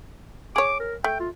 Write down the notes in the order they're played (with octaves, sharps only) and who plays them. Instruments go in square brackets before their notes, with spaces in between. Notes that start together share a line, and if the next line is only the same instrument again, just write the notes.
[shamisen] G#4 C#5 [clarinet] D6
[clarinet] A#4
[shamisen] A3 [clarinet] G5
[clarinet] F4